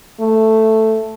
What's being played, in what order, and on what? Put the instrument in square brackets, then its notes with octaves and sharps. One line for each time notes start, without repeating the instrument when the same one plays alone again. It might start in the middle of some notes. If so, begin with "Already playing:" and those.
[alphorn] A3